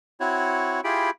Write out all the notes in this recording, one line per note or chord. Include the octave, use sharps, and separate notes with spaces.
C4 E4 F#4 C#5
E4 F4 G4 G#4 G5 B5